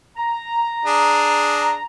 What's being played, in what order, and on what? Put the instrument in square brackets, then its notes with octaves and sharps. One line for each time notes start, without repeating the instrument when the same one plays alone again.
[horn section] A#5
[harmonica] D4 G#4